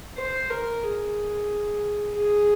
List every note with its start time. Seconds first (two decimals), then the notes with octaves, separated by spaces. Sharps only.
0.17 C5
0.50 A#4
0.83 G#4
2.14 G#4